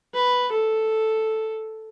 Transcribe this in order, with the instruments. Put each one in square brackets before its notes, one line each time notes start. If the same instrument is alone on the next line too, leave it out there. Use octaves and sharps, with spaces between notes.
[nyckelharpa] B4
A4